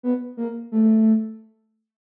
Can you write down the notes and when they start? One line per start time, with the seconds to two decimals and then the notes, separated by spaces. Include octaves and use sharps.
0.03 B3
0.37 A#3
0.72 A3